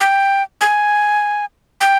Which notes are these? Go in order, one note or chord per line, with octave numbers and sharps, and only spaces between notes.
G5
G#5
G5